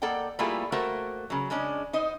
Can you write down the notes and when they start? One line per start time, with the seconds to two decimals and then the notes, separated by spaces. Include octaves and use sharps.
0.02 A#3 A4 D5 F#5 G5
0.39 G3 A3 A#3 E4 F4 G#4
0.72 A3 A#3 F#4 A#4 C5
1.30 C#3 F#3
1.50 C#3 G#3 C#4 D4
1.93 D#4 C5 D#5